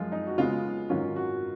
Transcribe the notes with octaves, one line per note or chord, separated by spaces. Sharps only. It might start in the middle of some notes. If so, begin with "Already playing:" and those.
Already playing: F#2 F3 G#3 F4
D#4
F#4
C#3 G#3 B3 F4
G#2 D#3 F#3 C#4 F4
F#4